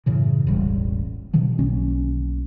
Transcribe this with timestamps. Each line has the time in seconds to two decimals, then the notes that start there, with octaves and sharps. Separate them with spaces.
0.06 F#2 A2 C#3 E3
0.47 E1 A1 G3
1.33 B2 D3 D#3 F3
1.59 B1 B2 A#3 C#4